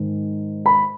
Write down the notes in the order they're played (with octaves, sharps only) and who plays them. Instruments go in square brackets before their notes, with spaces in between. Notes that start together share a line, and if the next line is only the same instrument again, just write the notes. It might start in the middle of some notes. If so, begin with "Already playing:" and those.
Already playing: [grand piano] G#2 D#3
B5